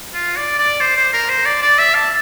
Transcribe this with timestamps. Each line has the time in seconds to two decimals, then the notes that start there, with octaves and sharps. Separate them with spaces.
0.14 F4
0.37 D5
0.58 D5
0.80 C5
0.97 C5
1.13 A#4
1.29 C5
1.46 D5
1.62 D5
1.79 E5
1.95 A5